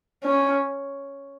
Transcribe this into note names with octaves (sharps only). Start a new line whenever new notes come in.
C#4